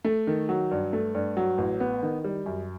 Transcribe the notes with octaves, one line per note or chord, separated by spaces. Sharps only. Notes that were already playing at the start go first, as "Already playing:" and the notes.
A3
D#3
F#3
G2
A3
G2
F#3
A1
B3
D#3
G3
F#2